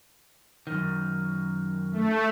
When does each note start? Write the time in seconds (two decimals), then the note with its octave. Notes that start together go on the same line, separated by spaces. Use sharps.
0.67 F#2 D#3
1.92 A3